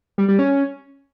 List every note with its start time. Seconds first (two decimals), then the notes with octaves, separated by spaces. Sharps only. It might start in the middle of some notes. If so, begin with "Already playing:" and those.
0.18 G3
0.28 G3
0.39 C#4